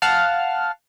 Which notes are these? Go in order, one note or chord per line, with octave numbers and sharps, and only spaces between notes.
F5 F#5 A5 F6